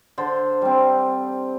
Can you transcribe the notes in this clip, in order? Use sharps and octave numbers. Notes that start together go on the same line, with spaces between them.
D3 C5
G3 C4